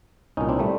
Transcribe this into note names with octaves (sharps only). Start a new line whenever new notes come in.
C2 A#2 C#4 D#4
C4 D4
G3 A3